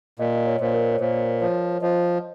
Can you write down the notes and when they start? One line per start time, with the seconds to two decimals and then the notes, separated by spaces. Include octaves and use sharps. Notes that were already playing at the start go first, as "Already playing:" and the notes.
0.19 A#2 D#5
0.35 D#5
0.47 C#5
0.61 A#2 C5
0.74 A#4
0.93 C#5
1.00 A#2 C5
1.42 F3 C#5
1.82 F3 D#5